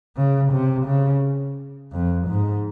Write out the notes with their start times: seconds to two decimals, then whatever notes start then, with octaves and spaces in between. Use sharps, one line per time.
0.16 C#3
0.52 C3
0.87 C#3
1.92 F2
2.28 G#2